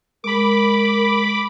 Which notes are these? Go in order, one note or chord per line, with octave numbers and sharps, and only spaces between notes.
G#3 A#4 B5 D6